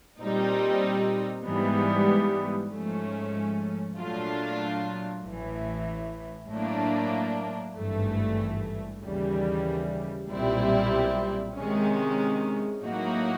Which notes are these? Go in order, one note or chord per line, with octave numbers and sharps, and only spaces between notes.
A#2 G3 C4 D#4
G#2 E3 G3 B3
G#2 F3 A3 C#4
A#2 F#3 A3 D4 F4
A1 A2 E3
A2 F#3 A#3 D4
G#1 G2 E3 A3
D#2 C#3 E3 G3
B1 A#2 G3 C4 E4
C3 D#3 G#3 C#4
A2 F#3 A#3 D#4 F#4